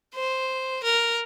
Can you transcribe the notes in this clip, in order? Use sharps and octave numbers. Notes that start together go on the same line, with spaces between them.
C5
A#4